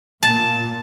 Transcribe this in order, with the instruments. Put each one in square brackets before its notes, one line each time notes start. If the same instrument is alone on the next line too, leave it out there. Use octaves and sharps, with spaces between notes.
[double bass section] A#2 [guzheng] A5